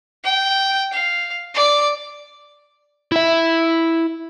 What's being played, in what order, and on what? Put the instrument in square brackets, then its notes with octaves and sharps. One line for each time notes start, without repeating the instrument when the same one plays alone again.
[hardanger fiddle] G5
F5
D5
[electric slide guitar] E4 E5